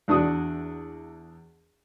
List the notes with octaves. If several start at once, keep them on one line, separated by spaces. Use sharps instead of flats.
E2 D4 F#4 D#6